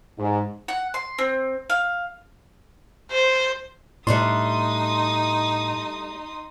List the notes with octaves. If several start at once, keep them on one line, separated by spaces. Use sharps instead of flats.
G#2
F#5
C6
C4
F5
C5
A2 G3 A3 D4 D#4 C6 D#6